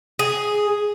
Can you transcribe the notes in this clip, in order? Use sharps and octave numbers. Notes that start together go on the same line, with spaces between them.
G#4